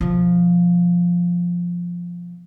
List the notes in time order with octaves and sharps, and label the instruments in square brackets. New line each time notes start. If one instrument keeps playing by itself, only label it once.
[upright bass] B2 F3